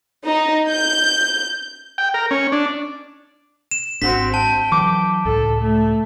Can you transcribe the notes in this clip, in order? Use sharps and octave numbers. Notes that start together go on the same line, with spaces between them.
D#4
G6
G5
A#4
C#4
D4
E7
G#1 C4 D4 F#4 B6
G5 A5
E3 F#3 D6
C#2 A2 A4
A3